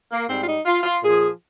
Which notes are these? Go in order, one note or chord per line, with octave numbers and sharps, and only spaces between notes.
A#3
G#2 G3 C4
F4
D#4
F4
F4
A#2 F3 G#4